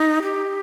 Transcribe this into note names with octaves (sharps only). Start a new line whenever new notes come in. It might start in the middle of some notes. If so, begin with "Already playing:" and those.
Already playing: D#4
G4